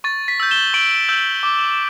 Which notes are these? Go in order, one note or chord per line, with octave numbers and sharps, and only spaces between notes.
C#6 A6
B6
E6 G6
E7 G7
C#6 D7 F#7
E6 G6
D6